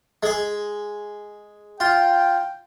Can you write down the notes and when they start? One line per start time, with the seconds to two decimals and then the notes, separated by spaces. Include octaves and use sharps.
0.23 G#3 G#4
1.80 F4 G5